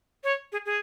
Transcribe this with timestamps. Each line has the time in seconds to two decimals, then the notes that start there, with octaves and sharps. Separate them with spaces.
0.24 C#5
0.52 G#4
0.66 G#4